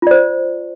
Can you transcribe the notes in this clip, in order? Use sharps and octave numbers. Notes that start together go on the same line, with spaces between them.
F4 C5 D5